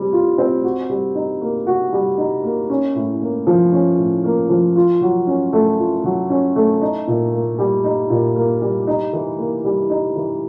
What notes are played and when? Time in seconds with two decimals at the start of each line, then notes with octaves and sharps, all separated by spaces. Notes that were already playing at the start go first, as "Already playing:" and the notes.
Already playing: G3 C4 G#4
0.13 F4
0.38 C4
0.64 F#4
0.90 G3
1.15 D#4
1.41 A#3
1.67 F#4
1.93 G3
2.18 D#4
2.44 A#3
2.70 C#4
2.95 A2
3.21 A#3
3.47 F3
3.73 C#4
3.98 A2
4.24 A#3
4.50 F3
4.76 F4
5.01 F#3
5.27 C#4
5.53 A3
5.79 F4
6.04 F#3
6.30 C#4
6.56 A3
6.81 D#4
7.07 A#2
7.33 A#3
7.59 G3
7.84 D#4
8.10 A#2
8.36 A#3
8.62 G3
8.87 D#4
9.13 E3
9.38 A#3
9.65 G3
9.90 D#4
10.16 E3